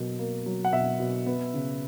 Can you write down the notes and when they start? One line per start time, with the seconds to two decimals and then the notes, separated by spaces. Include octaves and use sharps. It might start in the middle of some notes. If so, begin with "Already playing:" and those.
Already playing: B2 F#3 A#3
0.19 A#3
0.46 F#3
0.64 F#5
0.73 B2 E5
1.00 B2
1.26 B3
1.54 C#3